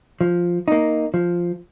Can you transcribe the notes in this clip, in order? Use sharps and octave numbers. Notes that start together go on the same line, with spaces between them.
F3
A#3 D#4
F3